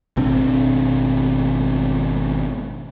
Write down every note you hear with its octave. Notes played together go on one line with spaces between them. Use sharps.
G#1 B2 C4 D4